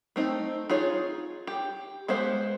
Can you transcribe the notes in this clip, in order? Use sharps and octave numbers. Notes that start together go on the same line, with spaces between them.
A3 C4 D#4
D#4 F4 G#4 C#5
G4
G#3 B3 G4 C5 F5